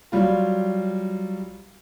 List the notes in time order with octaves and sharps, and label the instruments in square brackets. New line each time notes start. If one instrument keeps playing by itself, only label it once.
[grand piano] F#3 G3 F4